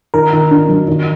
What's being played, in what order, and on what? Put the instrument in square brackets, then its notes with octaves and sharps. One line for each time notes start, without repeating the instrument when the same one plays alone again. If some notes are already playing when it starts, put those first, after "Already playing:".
[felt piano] D#3 [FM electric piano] A#4
[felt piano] D#3
D4
F#3
D#3